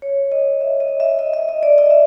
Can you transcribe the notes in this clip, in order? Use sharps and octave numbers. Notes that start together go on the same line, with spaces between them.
C#5
D#5
E5
D#5
E5
D#5
E5
D#5
D5
D#5
E5